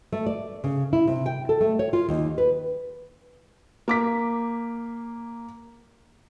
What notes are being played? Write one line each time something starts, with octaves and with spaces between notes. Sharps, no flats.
A3
D5
C#3
E4
C3
G5
A4
A3
C#5
F4
D#2
B4
A#3 D6 B6